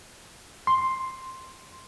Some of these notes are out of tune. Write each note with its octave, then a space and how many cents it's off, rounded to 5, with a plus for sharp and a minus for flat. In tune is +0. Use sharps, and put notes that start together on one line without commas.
C6 +5